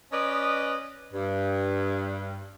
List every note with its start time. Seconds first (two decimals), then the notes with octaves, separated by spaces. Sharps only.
0.12 C#4 B4 D5 D#5
1.13 G2